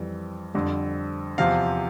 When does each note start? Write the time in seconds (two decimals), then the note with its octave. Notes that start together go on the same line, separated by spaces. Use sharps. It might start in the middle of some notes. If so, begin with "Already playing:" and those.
Already playing: F2 E3 G3
0.54 F2 D3 G3
1.38 E2 C3 F3 F5